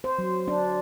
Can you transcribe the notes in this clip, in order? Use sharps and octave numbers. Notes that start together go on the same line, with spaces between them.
C5
F#3
D4